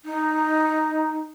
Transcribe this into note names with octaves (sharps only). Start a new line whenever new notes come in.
D#4